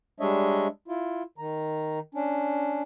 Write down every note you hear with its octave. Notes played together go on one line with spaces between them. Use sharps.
G3 G#3 D4 C#5 D#5 E5
E4 F4
D#3 A#5
C#4 D4